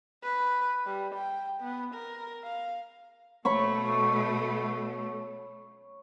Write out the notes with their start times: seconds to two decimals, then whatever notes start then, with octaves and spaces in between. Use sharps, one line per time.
0.23 B4
0.86 G3
1.15 G5
1.61 B3
1.95 A#4
2.44 F5
3.45 B2 A3 C#5 B5 C#6